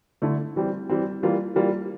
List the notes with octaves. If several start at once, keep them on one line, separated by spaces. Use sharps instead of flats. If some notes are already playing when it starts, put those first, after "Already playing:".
D3 A3 E4
E3 G3 C4
E3 G3 C4
E3 G3 A#3 F4
E3 G3 A#3 F4